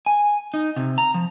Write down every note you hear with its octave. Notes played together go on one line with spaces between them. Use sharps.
G#5
D#4
C3
A#5
F3